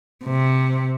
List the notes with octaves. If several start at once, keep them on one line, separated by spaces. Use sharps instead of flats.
C3